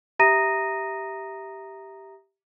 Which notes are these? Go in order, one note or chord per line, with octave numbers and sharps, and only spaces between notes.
G4 E5 A#5 D#6 A#6 D#7